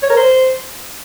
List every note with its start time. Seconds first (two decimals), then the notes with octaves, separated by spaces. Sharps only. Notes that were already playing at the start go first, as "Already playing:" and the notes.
0.03 C#5
0.10 A#4
0.17 C5